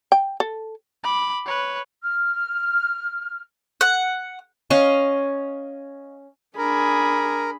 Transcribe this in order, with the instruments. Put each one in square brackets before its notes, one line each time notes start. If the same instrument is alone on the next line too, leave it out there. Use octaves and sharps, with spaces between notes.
[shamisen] G5
A4
[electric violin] B5 D6
B4 C#5
[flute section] F6
[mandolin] F#5
[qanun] C#4 D#5 F5 C#6
[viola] D4 G#4 [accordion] A#4 [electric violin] B5